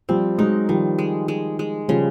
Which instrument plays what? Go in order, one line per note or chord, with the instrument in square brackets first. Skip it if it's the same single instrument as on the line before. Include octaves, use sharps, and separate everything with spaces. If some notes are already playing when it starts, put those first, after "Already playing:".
[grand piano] F3 G3 [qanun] C4
[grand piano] F#3 G#3 [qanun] D#4
[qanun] D#3 [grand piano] F3 G3
[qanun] G#3
G#3
G#3
[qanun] C#3 [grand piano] F3 G3